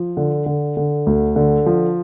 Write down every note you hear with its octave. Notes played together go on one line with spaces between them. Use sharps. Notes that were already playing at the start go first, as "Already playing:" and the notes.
Already playing: F3
D3
D3
D3
D2
D3
F3